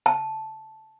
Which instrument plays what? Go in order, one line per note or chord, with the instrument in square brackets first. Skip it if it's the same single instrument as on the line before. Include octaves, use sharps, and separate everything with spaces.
[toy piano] A5